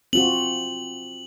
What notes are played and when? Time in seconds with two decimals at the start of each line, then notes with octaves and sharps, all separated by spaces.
0.13 C4 F4 F#4 F#7